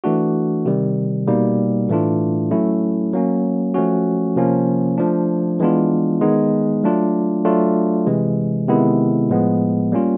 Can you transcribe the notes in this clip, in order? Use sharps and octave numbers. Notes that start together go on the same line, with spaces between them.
E3 A3 D4 F#4
C3 D#3 G3
B2 G3 A#3 D#4
A2 E3 A3 D4 F4
F#3 A3 C#4 E4
F#3 A#3 C#4
F3 A3 C#4 F#4
C3 F3 A#3 C#4
F3 A3 D4
E3 G#3 B3 D4 F4
D#3 G#3 B3 D#4
F#3 A3 D4 F4
F#3 A3 D4 F4
C3 E3 G#3
C3 D#3 G#3 B3 E4
A2 F3 G#3 B3
G3 A#3 C#4 F4